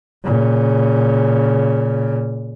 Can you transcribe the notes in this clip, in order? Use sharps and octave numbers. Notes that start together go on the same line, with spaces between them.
A#2 C#3